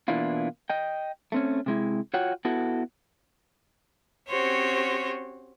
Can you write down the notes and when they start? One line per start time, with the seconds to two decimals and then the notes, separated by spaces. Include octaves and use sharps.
0.08 B2 E3 A#3 D4 E4 F4
0.70 D#5 G5
1.32 A3 C4 C#4
1.66 C3 G#3 E4
2.14 F4 F#4 C#5 F#5 G5
2.45 B3 E4 F#4 A4
4.28 C4 C#4 F#4 G4 C5 C#5